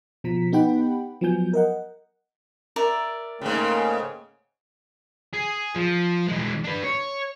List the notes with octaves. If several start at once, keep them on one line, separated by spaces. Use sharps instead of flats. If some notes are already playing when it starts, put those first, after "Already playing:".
B2 F3 A#5 B6
B3 D#4 G4 F#5 G5 B5
F3 F#3 B3 G#5 G6
A#4 D#5 F#5
A#4 D5 E5
G#2 C#3 A3 A#3 G5
G#4
F3
E3 G#3
D4 B4
C#5